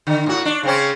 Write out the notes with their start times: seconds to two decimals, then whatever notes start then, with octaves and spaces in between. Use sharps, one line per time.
0.07 D3
0.26 A2 F#4
0.45 D4
0.63 C#3 C4 C#4